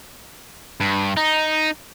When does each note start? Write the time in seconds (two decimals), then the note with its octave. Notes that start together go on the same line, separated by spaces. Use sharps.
0.81 G2
1.17 D#4